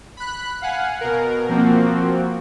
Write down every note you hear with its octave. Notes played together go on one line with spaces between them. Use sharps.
B5 F#6
F5 F#5 G#5
B2 A#4
F3 A#3 C4 F#4